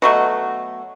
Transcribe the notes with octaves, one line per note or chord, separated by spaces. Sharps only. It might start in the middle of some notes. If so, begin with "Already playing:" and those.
B2 F#3 A3 F#4